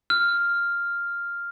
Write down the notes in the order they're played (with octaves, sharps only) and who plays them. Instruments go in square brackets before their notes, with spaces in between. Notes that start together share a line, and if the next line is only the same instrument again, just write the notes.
[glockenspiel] F6